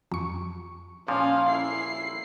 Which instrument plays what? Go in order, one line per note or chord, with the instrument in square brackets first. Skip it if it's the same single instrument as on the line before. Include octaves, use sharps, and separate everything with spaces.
[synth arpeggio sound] F2 C#6
[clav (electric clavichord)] A#2 F3 [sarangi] C#4 [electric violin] F5
[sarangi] E4 [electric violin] C7